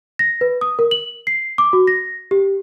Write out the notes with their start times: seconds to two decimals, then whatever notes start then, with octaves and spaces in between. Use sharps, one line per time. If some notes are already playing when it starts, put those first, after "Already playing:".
0.19 A#6
0.41 B4
0.61 D#6
0.79 A#4
0.91 F#7
1.27 C7
1.58 D6
1.73 F#4
1.87 A#6
2.31 G4